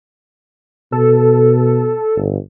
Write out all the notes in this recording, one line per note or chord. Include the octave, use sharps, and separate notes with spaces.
B2 A4
G1